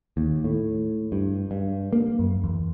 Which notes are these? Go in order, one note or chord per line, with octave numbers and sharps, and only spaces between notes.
D#2
A2
G2
G2
A#3
F#2
E2